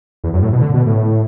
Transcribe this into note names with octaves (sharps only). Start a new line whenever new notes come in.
E2
F#2
A2
B2
D3
B2
A2